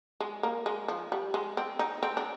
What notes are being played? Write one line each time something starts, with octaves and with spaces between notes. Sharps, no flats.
G#3
A#3
G#3
F3
G3
G#3
C4
D#4
C4
D4